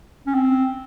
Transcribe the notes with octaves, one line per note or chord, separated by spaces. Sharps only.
C#4
C4